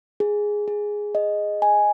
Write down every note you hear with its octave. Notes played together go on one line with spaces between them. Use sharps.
G#4
G#4
D#5
G#5